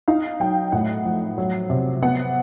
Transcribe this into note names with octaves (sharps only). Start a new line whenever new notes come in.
D#4 F5
F#3 G5
A2 F#5
F3
F#3
C3
B3 F#5